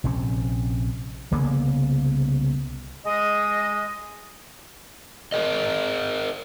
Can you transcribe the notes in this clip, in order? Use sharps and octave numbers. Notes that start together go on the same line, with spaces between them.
A#1 C3 C4 C#4
C2 C#3 A#3 B3
G#3 D#5
G#4 A#4 D#5